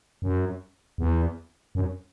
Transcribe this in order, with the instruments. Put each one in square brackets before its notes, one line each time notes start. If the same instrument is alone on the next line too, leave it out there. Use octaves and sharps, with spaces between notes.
[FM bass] F#2
E2
F#2